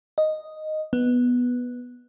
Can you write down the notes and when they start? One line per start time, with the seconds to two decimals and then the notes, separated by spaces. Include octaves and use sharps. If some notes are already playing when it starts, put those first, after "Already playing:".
0.18 D#5
0.93 B3